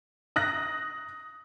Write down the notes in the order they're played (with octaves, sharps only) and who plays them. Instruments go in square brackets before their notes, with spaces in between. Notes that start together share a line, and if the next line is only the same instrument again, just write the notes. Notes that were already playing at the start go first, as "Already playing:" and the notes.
[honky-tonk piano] D#6 F#6 A#6